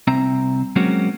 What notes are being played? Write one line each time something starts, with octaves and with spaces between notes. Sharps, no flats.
C2 C4 E5 A#5
F#3 G#3 A#3 C4 C#4 F#4